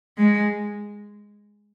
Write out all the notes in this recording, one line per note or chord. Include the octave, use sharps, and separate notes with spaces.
G#3